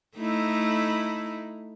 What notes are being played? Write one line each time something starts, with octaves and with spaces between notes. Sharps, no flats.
A3 D#4 E4